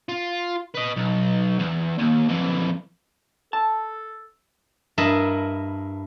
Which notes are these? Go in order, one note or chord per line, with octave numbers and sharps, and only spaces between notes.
F4
B4 D#5
B1
E2
D#2
F2 E3
A4 A5
G2 E4 A#4 D#5 E5 A5